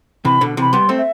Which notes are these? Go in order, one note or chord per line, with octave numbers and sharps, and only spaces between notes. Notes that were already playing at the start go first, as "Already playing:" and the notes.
C3 E3 B5
B2 D3
C3 E3 B5
G3 B3 C6
A3 C4
E5